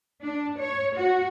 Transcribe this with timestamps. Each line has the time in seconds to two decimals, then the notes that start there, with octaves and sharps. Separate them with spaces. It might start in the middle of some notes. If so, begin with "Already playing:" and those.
0.22 D4
0.59 C#5
0.96 F#4